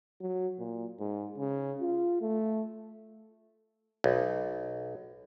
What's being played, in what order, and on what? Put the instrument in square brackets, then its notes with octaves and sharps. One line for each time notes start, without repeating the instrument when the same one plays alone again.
[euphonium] F#3
A#2
G#2
C#3
F4
A3
[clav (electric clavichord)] B1